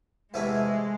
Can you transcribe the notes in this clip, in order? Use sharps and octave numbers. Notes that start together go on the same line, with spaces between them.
E2 C3 E3 G#3 A3 E4